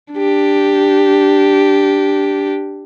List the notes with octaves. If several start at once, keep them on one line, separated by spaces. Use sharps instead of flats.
D4 G4